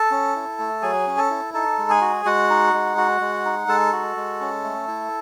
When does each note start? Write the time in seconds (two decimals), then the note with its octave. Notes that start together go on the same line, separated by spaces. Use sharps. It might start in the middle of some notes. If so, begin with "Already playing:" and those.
Already playing: A4 A5
0.11 C#4
0.35 E4
0.59 A3
0.82 F#3 G#4 G#5
1.07 C#4
1.18 A4 A5
1.30 E4
1.54 D#4 A4 A5
1.78 G#3
1.89 G#4 G#5
2.01 F#4
2.25 G#3 F#4 F#5
2.50 D#4
2.74 G#3
2.97 F#4
3.21 G#3
3.45 D#4
3.68 G#3 A4 A5
3.92 F#4
4.16 G#3
4.41 C#4
4.64 A3
4.88 E4